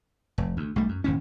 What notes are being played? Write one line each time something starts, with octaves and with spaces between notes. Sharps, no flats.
F1
D2
B1 G3 A3
F#2
E1 D#2 A2 C#4